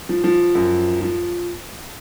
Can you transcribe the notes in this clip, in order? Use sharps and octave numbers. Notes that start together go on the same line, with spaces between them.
F3
F3
F#2
F3